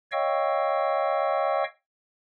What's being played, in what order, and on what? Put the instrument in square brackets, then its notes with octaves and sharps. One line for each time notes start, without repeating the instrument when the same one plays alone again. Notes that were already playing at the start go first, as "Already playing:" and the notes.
[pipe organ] C#5 D#5 F5 G5 C#6 E6